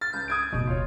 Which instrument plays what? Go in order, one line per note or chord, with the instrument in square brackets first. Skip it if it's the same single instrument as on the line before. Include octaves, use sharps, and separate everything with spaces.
[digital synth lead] F6 [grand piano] A6
[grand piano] C#2 [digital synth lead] G6
[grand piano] D#6 G#6 D7
[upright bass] F#1 D#2 [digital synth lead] B2
[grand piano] F4 C#5